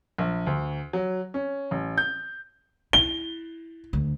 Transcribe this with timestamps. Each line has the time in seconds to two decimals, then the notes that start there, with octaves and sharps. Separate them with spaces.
0.18 A#1
0.47 D2
0.93 F#3
1.34 C#4
1.71 A1
1.98 G6
2.93 E4 G7
3.93 D2